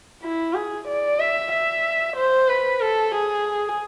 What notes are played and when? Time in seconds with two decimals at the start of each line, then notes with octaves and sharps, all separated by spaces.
0.23 E4
0.54 G#4
0.88 D5
1.20 E5
1.52 E5
2.16 C5
2.49 B4
2.81 A4
3.15 G#4